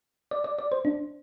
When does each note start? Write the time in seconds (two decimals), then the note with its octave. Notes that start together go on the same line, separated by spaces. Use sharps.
0.31 D5
0.44 D5
0.59 D5
0.72 C5
0.85 D4